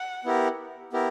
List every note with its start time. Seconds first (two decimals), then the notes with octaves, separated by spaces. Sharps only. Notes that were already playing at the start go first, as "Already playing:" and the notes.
Already playing: F#5
0.25 B3 E4 G4 A#4
0.93 B3 E4 G4 A#4